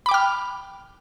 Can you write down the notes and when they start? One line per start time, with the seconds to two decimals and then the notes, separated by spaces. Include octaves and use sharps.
0.06 B5
0.09 D6
0.11 G5
0.14 F6